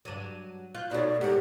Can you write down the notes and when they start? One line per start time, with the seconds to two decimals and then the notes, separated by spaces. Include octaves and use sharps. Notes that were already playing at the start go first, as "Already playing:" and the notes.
0.05 G2 F#3 D4 D#7
0.75 F4 F#6 G6
0.91 B2 A3 D#4 F#4 C#5 D5
1.21 E2 G#2 G4 A#4 F#5